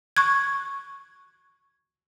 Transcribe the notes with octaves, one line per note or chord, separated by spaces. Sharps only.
C#6 F#6 G#6